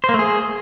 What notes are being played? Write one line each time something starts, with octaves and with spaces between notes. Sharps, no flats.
C5
A#3
A3
G#4